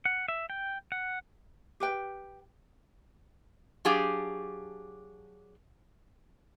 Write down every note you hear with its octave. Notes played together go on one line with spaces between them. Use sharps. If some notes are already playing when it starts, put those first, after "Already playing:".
F#5
E5
G5
F#5
G4 B4 G5
F#3 D4 G4 G#4 F5